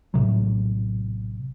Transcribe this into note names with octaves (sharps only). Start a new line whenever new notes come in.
A#1 A2 C3 F#3